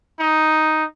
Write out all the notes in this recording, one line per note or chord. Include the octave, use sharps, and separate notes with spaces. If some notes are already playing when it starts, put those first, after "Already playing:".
D#4